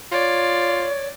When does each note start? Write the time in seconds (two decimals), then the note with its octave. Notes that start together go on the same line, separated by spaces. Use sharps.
0.12 F4 C#5 D5